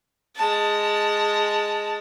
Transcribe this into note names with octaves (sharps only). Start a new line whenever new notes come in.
G#3 A5